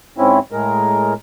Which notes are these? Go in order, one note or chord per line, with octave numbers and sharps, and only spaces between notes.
G#2 C4 C#4 E4
A2 G#3 A#4